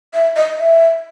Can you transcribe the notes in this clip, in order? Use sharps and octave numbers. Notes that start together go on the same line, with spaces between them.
E5
D#5
E5